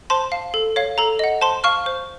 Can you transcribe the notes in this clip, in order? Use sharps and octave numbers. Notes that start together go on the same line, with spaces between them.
C5 A5 C6
F5
A4
C#5 F5
A4 A#5
D#5 F#5
C5 A5 C6
F5 C#6 F6
C5